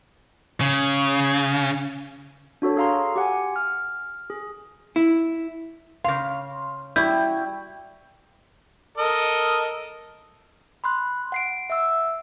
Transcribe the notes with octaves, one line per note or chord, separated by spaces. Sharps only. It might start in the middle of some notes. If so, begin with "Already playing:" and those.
C#3
D4 F#4 A4 C#5
G#4 A4 F5 A#5 C6
G4 F#5 G#5
F6
G#4
E4
C#3 F5 C6
G3 E4 F#4 G6
A4 A#4 D#5
B5 C6 F#6
F#5 C7 D7
E5 F#5 E6